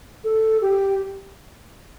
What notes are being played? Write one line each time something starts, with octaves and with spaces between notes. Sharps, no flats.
A4
G4